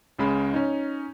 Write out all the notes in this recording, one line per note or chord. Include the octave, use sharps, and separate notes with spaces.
C#2 C#3 G#3 B5
C#4 D#4